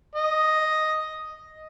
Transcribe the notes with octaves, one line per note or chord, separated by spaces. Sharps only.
D#5